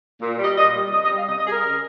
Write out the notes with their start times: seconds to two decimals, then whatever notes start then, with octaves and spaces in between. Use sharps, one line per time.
0.21 A#2
0.38 G3
0.44 D#5
0.56 A#2 D#5
0.74 G3
0.91 C3 D#5
1.03 D#5
1.10 G3
1.16 F5
1.27 C3 D#5
1.38 D#5
1.44 G3 G#4
1.51 A#4
1.63 C#3